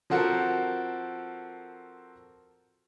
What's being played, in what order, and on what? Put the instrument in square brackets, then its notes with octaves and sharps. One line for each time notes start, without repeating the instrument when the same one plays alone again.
[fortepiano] F3 C4 F#4 A4 A#4